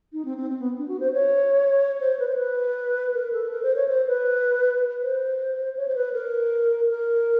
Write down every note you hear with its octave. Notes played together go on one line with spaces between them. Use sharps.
D#4
C4
C4
C4
B3
D4
F#4
C5
C#5
C5
B4
C5
B4
A#4
A4
A#4
C5
C#5
C5
B4
C5
C#5
C5
B4
A#4
A#4